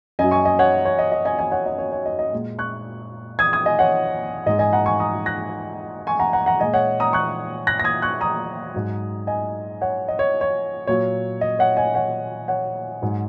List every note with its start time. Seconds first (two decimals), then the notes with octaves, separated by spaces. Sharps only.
0.19 F#2 F#3 D#5 G#5
0.31 G#5 C#6
0.45 D#5 G#5
0.59 C#5 F#5
0.85 C#5
0.99 D#5
1.12 D#5
1.25 D#5 G#5
1.39 D#5 G#5
1.52 C#5 F#5
1.66 D#5
1.79 C#5
1.92 C#5
2.06 D#5
2.19 D#5
2.33 A#2 G#3
2.59 C#6 F#6
3.39 D#6 G#6
3.53 D#6 G#6
3.66 D#5 G#5
3.79 C#5 F#5
4.46 G#2 G#3 D#5
4.59 D#5 G#5
4.73 F#5 A#5
4.86 G#5 C#6
5.00 A#5 D#6
5.26 F#6 A#6
6.07 G#5 C#6
6.20 F#5 A#5
6.33 F#5 A#5
6.46 F#5 A#5
6.60 A#2 G#3 D#5 G#5
6.73 C#5 F#5
7.00 A#5 D#6
7.13 C#6 F#6
7.67 F#6 A#6
7.80 A#6
7.84 D#6 G#6
8.02 C#6 F#6
8.21 A#5 D#6
8.74 G#2 F#3
9.27 D#5 G#5
9.81 C#5 F#5
10.08 D#5
10.19 C#5
10.41 C#5
10.87 A#2 F#3 C#5
11.41 D#5
11.59 C#5 F#5
11.77 D#5 G#5
11.95 C#5 F#5
12.48 C#5 F#5
13.02 G#2 F#3